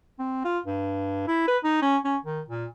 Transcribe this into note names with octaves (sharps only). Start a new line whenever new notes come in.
C4
F4
G2
E4
B4
D#4
C#4
C#4
D#3
A#2